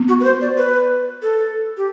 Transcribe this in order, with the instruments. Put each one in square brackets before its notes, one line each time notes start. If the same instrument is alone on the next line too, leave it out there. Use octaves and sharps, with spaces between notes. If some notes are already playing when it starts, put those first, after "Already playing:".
Already playing: [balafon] B3
[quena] F#4
B4
C5
D5
B4
A4
G4